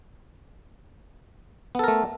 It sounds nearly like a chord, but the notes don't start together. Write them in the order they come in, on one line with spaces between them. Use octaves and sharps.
B3 A4 A#4 A3